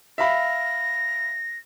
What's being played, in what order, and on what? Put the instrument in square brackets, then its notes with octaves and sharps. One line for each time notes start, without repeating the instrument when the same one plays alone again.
[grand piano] E5 F5 B5 [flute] A#6